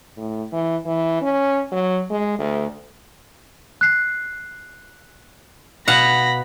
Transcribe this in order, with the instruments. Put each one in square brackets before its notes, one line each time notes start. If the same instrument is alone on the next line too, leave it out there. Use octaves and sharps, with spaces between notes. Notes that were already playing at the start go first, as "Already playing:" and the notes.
[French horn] A2
E3
E3
C#4
F#3
G#3
D2
[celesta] F#6 C7
[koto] B2 F5 F#5 [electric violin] B5 A#6